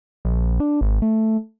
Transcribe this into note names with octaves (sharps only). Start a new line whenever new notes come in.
A#1
D4
G#1
A3